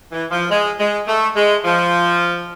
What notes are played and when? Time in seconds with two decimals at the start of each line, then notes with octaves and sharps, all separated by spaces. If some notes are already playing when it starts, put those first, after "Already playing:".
0.12 E3
0.31 F3
0.50 G#3
0.79 G#3
1.07 A3
1.36 G#3
1.65 F3